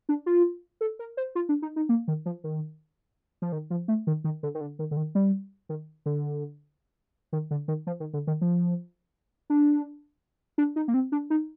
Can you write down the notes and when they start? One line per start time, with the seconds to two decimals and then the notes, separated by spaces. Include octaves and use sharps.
0.09 D4
0.26 F4
0.81 A4
0.99 A#4
1.17 C5
1.35 F4
1.49 D4
1.62 D#4
1.76 D#4
1.89 A#3
2.08 D#3
2.26 F3
2.44 D#3
3.42 F3
3.52 D#3
3.70 F3
3.88 A3
4.07 D#3
4.24 D#3
4.43 D3
4.55 D#3
4.61 D3
4.79 D#3
4.91 D3
4.97 D#3
5.15 G3
5.69 D#3
6.06 D3
7.33 D#3
7.51 D3
7.68 D#3
7.87 F3
8.00 D#3
8.13 D3
8.27 D#3
8.41 F3
9.50 D4
10.58 D4
10.76 D#4
10.88 A#3
10.94 C4
11.12 D4
11.30 D#4